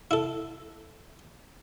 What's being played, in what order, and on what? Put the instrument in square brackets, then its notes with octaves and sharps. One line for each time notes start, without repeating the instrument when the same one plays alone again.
[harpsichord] E4 A4